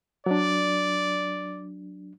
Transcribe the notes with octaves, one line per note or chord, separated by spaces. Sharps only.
F#3 D4 D5